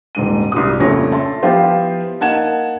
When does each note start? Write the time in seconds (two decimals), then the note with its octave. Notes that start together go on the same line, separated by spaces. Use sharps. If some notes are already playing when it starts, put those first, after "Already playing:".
0.15 D#1 G#2 D#7
0.52 C2 F#4 D#6
0.80 A#1 F2 C#3 A3 C#5 A#6
1.12 E5 A5 C6
1.43 F3 B3 E4 F4 G4 C5
2.20 A#3 D#4 F#5 A5 G#6 E7